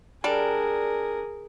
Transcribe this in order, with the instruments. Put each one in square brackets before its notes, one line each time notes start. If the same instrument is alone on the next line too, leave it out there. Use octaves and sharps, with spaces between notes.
[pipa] G3 D4 [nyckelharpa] G#4 A#4